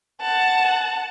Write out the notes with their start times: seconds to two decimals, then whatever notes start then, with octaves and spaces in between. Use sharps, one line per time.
0.21 F#5 A5